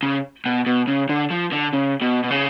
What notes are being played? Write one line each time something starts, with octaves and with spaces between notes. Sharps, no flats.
C#3
B2
B2
C#3
D3
F3
D3
C#3
B2
B2
C#3